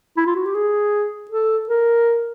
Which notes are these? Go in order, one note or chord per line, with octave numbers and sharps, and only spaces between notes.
E4
F4
F#4
G4
G#4
A4
A#4